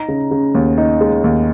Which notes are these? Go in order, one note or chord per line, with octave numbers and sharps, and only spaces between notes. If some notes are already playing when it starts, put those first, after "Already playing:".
Already playing: D#4 A#5
C#3
C#3
D#2
D#4
G#3
D#2